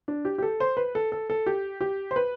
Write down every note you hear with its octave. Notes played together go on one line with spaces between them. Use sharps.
D4
G4
G4
A4
C5
B4
A4
A4
A4
G4
G4
C5
B4